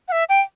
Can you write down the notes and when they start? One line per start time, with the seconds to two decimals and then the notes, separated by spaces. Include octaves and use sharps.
0.08 F#5
0.12 E5
0.29 G5